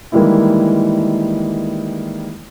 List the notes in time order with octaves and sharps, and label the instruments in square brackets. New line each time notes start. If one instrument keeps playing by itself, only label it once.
[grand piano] D#3 E3 G3 G#3 A#3 E4